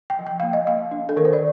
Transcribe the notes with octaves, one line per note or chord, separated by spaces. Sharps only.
G5
F3
G5
A#3 F5
D#5
A#3 F5
D4
A4
D#3 A#4
C5
D5